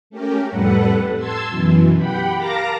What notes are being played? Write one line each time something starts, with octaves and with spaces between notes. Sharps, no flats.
A3 C#4 G4 A#4
F2 A2 G3 A4 B4 F#5
A5 C6 E6 G#6
F#2 B2 E3
G4 F#5 G5 B5
A#4 F5 A5 A#5 D6 A#6